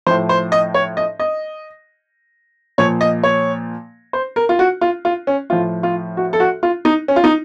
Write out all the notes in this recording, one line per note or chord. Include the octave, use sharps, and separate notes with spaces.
A2 F3 C5
C5
D#5
C#5
D#5
D#5
A#2 F3 C#5
D#5
C#5
C5
A#4
F4
F#4
F4
F4
C#4
A2 F3 F4
F4
F#4
A4
F#4
F4
D#4
C#4
F4
D#4